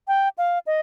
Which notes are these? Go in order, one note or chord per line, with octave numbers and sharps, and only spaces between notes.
G5
F5
D#5